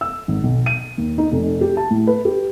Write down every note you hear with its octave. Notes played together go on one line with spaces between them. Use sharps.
E6
G#1
B1
D#7
D#2
D#4
F1
G4
A5
A2
B4
G4